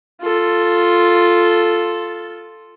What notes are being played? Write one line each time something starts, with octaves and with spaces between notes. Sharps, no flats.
F4 A4